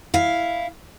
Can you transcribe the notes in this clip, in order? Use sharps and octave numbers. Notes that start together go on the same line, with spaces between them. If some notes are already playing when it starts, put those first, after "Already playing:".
E4 F5